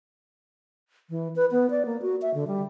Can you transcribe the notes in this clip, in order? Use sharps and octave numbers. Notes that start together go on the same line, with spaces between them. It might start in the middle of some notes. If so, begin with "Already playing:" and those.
E3
B4
B3
D5
A#3
F#4
E5
D3
G3